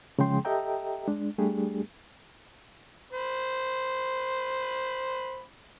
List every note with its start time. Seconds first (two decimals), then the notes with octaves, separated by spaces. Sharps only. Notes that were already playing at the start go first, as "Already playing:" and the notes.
0.19 C#3 F3 G#3 G#4 G5 C6
0.45 G4 A4 D#5 E5 G5 A#5
1.08 G#3 D4
1.38 G3 A3 D4 G4 G#4
3.13 C5 B5